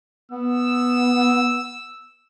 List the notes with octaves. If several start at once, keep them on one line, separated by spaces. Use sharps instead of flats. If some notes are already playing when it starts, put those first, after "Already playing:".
B3 E6